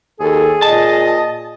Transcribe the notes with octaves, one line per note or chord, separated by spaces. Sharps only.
D#2 G#4 A4
A#2 D#5 A5